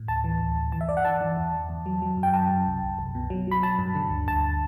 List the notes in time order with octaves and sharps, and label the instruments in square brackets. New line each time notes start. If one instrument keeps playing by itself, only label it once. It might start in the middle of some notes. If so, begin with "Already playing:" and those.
Already playing: [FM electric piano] A2
D2 A5
E3
D2
D2
E3 A5
E5
G2 D5
F#5
E3 A5
E3
E2
E2
E2
F#3
F#3
F#2
G5
F#2 A5
F#2
C2
C2
C2
B2
F#3
F#3 B5
F#3 A5
G2
D3
D2
D2 A5